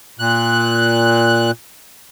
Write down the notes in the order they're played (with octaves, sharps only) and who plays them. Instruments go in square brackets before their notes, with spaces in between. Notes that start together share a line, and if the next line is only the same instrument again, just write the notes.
[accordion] A#2 F#6